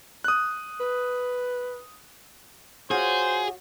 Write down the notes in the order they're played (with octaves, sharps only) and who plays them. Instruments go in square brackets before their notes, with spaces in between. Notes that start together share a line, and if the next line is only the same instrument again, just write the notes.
[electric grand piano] D#6 F#6
[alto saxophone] B4
[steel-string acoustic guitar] F4 F#4 C#5 [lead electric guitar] G#4 [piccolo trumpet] C5